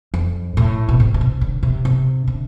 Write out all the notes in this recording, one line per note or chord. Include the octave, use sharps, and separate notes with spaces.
F2
A2
B2
C3
B2
C3
D3
C3
C3
D3